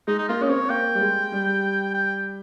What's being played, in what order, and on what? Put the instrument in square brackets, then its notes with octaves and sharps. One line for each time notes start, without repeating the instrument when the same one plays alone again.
[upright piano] G#3 [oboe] D#4
[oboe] D#4
[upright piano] A#3 [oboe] F4
[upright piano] C#4 [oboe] D#5
[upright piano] C4 [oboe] C#5
[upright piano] A#3 [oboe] G5
[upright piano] G3
G#3
G3
[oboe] G5